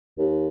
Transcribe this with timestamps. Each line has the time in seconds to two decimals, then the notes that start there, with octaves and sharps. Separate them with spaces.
0.18 D#2